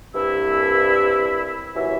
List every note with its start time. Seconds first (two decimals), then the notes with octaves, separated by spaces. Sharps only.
0.14 C2 G2 E4 E6
1.75 D#2 E3 F#3 C#4 E5